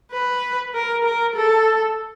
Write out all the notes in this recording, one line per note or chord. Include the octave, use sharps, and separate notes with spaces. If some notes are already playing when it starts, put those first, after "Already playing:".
B4
A#4
A#4
A4